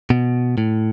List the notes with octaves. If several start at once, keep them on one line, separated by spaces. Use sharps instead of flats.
B2
A2